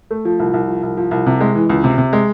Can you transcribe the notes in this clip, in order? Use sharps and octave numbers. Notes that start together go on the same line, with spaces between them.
A3
F3
C2
C2
F3
C2
F3
C2
C3
G#3
E3
C#2
C3
C3
G#3